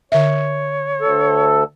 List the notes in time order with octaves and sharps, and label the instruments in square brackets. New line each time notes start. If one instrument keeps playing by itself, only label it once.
[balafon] D3 E5 [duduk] C#5
[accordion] D2 A4